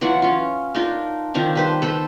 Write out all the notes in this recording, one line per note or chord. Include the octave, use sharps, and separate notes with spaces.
E3 F#3 F4 F#5
C#4 F4
D4 D#4 F4 A#4
D#3 F3 C4 D4
G3 B4 C5
A4 B4 C5 B5